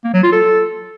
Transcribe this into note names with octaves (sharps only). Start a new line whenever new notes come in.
A#3
F#3
F4
A4